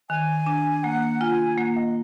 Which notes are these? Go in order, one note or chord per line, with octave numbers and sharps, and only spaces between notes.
D#3 G#5
D4
A#3 F#5
F4 G#5
A#3 F#5
D#5